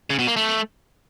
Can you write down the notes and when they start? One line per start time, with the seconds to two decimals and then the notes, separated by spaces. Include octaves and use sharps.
0.10 C#3
0.19 B2
0.28 A#3
0.36 A3